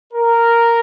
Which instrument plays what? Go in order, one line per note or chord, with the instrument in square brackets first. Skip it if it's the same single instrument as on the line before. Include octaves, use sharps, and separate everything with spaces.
[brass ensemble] A#4